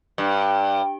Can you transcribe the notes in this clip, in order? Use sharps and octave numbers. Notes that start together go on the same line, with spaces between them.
G2